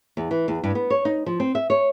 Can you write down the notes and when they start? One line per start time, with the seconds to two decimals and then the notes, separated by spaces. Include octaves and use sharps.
0.17 E2
0.31 E3
0.48 E2
0.64 G2
0.75 B3
0.90 C#5
1.05 D#4
1.26 F3
1.40 C4
1.55 E5
1.70 C#5